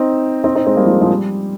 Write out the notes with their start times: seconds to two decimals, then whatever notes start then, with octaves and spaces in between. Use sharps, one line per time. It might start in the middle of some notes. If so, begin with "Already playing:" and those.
Already playing: C4 D#4
0.44 C4 D#4
0.55 C4 D#4
0.66 G#3 C4
0.76 G3 A#3
0.85 F3 G#3
0.93 G3
1.01 F3 G#3
1.10 G3